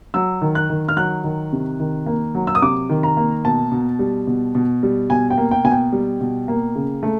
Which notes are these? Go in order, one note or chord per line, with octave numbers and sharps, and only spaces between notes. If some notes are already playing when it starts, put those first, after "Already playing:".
F#3 E6
D#3
F#6
D#3
F6
F#3 F#6
D#3
C3
D#3
A#3
F#3
E6
D#6
C3 D6
D#3
A#5
A#3
B2 A5
B2
G3
B2
B2
G3
B2 G#5
G5
A#3
G5
B2 G#5
G5
G3
B2
A#3
C#3
A3